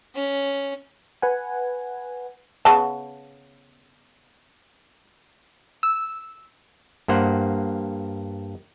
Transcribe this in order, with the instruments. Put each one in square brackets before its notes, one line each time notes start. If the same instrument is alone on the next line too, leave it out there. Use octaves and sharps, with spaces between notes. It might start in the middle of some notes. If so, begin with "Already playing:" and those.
[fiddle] C#4
[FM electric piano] B4 F#5 G#5
[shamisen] C#3 B3 A5
[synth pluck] E6
[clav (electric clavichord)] G2 A#3 C5 F#5